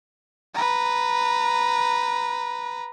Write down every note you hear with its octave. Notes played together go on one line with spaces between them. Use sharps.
B4 A#5